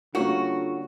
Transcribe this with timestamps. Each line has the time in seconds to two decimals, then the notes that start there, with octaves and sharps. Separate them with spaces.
0.15 D3 G3 A#3 C#4 F4 F#4 A#4 C#5